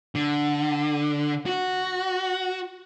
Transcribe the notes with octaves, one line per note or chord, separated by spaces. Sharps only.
D3
F#4